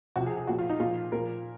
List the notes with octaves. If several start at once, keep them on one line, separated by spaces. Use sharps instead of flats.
C3 F3 F#4
G#4
G#4
A#2 F3 F#4
F4
D#4
A#2 F3 F4
A#2 F3 A#4